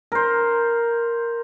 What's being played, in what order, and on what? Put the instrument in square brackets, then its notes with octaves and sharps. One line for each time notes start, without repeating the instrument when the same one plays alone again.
[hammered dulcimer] A#4 C5